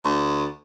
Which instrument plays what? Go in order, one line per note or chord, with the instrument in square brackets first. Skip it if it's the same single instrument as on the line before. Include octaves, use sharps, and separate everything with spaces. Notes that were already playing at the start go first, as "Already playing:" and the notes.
[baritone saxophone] D2